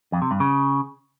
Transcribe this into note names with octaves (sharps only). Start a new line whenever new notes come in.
F2
C3
G2
C#3